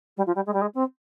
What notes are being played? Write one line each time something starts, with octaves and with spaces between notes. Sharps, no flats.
G3
F3
G3
G#3
G3
G#3
C4